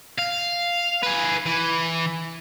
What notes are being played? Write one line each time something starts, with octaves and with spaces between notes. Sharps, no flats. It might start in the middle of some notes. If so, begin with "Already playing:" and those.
F5
G#4 B4
E3